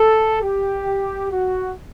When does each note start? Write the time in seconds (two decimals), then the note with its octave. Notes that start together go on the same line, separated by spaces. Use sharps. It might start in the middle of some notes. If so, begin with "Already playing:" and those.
Already playing: A4
0.43 G4
1.32 F#4